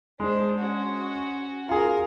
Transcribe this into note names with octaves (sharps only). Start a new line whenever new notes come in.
G#3 D4 C5
C#4 F#4
F4 G#4 A#4